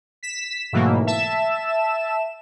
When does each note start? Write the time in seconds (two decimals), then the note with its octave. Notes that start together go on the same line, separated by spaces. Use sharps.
0.23 B6 E7
0.73 G#2 B2 E3 F#3 A3 A#3
1.07 E5 A5 E7